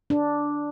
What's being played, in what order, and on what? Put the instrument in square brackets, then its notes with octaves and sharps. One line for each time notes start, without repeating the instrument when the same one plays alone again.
[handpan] D4